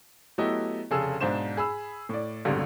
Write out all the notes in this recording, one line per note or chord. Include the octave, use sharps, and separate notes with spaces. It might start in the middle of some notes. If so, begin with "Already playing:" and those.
F#3 A3 B3 E4 G4 D#5
F1 C#3 G#4 A4 E6
B1 G#2 D4 C5 E7
G#4 B5 E6
A2 D5
D#1 G#1 C#2 G2 B2 D3